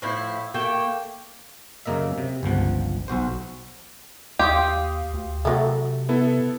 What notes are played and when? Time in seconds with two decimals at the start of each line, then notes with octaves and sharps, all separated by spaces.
0.02 A2 F3 E4
0.54 A3 A#3 G5
1.86 F#2 C#3 A#3 D#5 E5
2.18 C3
2.43 G1 C#2 F3 F#5
3.08 B1 F#4 C5
4.39 D#2 G4 F5 C6 D#6
5.13 D2
5.45 C3 F#3 A3
6.09 B3 E4 A4